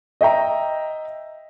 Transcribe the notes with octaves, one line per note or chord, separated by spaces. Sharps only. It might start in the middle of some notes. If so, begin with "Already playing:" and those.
D#5 E5 G5 A#5